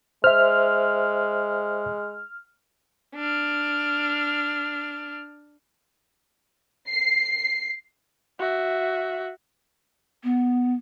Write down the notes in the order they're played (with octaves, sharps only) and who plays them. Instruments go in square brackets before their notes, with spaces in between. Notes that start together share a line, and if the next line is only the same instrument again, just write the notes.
[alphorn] G#3 [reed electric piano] C5 E5 [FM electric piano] F6
[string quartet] D4 F6
[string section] C7
[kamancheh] F#4 E5
[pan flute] B3